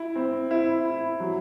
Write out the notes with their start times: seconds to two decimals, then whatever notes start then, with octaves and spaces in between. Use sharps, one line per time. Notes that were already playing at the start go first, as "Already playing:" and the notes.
Already playing: E4
0.15 C4
0.51 E4
0.85 E4
1.20 F#3